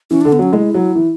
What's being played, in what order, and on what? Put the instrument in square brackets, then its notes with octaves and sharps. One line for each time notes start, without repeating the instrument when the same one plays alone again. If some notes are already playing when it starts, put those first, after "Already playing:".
[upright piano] E3 [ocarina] C#4
[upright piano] D3 [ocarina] D4
[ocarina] B3
[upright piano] F#3 [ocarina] C#4
[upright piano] G#3 [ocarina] E4
[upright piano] F#3
E3